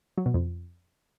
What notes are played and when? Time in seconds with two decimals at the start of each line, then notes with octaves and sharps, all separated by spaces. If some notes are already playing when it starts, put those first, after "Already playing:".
0.17 F#3
0.26 B2
0.34 F2